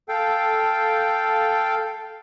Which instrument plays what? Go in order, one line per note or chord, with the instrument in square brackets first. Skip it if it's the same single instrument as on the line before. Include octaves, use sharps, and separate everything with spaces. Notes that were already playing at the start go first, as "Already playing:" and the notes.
[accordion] A4 F5 G5